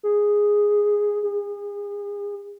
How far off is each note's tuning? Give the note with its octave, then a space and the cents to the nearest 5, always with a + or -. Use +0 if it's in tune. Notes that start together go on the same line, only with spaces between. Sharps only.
G#4 -5
G#4 -35